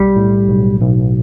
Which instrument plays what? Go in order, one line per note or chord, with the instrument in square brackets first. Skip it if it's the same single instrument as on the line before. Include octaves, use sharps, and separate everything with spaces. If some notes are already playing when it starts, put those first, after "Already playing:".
Already playing: [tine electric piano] B1 [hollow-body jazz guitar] G3
[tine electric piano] A2
B1
B1